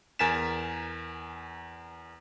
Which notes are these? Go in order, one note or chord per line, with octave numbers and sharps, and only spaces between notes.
E2 A#4 G#5 A6 B6 E7